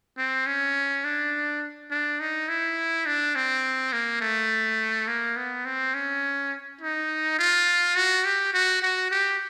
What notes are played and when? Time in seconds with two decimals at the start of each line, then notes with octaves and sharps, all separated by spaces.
0.18 C4
0.47 C#4
1.05 D4
1.91 D4
2.20 D#4
2.49 E4
3.06 D4
3.35 C4
3.93 A#3
4.21 A3
5.08 A#3
5.37 B3
5.65 C4
5.94 C#4
6.81 D#4
7.39 F4
7.96 F#4
8.25 G4
8.54 F#4
8.82 F#4
9.11 G4